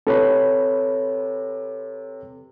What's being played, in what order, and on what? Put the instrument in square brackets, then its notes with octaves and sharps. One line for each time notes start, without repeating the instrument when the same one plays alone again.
[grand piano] C3 [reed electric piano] A4 B4 C#5